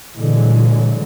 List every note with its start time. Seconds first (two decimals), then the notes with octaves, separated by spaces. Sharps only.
0.17 A#2 D3 E3 F#3 G#3